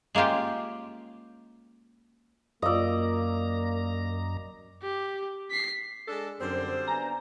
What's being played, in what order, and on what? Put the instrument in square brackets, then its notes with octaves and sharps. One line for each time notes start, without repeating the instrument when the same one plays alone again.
[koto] G#3 A#3 C#4 F4 G4
[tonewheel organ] F#2 A#5 [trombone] A#3 [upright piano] F4 E6 [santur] D5 D#5
[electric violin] G4
B6 C7
[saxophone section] G#3 D4 A4
[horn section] F#2 [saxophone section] D3 G3 C4 [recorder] C5
[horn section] B3 D4 G#5 [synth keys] A#5